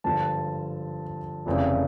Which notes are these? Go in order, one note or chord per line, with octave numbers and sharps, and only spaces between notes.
G#1 G2 D3 F3 A5
F1 F2 C#3 E3